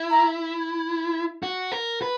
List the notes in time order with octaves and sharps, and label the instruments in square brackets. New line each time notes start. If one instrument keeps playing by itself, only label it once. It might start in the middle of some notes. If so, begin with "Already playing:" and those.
Already playing: [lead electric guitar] E4
[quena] A#5
[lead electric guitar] F#4
A#4
B4